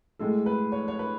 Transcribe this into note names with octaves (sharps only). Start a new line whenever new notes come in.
A2 G#3 A4
B4
C#5
C#5
B4